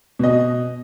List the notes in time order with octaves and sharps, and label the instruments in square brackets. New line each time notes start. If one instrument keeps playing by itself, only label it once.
[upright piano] B2 D#5